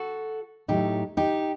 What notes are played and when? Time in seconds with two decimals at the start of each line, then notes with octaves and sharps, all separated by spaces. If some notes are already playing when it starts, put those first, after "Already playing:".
Already playing: F#4 A4
0.68 A2 F#3 A3 D#4 G4
1.17 D#4 G4